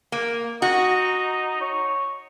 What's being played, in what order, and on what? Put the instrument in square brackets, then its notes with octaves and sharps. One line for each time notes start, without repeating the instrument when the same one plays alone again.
[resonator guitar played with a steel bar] A#3
[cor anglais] D#4 [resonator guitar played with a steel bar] F#4
[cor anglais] C#5